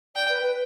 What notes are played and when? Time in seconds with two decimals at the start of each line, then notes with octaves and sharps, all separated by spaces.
0.15 D5 G5
0.29 B4
0.43 B4